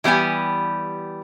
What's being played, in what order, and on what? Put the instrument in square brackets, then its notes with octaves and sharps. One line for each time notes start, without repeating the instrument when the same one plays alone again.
[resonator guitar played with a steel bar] E3 G3 B3 G4 G#5